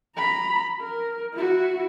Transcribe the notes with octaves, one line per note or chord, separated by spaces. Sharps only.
A#5 B5
A#4
E4 F#4